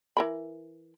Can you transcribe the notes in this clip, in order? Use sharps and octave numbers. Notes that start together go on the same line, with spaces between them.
E3 A#4 B5